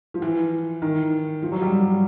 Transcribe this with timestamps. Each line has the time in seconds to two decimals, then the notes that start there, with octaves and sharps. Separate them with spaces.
0.14 F3
0.22 E3
0.82 D#3
1.42 F3
1.52 F#3
1.62 G3
1.72 G3